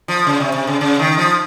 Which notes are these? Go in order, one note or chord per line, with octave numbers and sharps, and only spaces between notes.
F3
C#3
C3
C3
C#3
C#3
D#3
F3